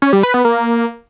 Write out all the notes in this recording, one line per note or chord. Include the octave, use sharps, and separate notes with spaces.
C#4
G3
B4
B3
A#3